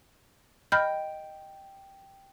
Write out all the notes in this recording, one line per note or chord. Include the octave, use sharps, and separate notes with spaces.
D#5 G5 B5 F6 G6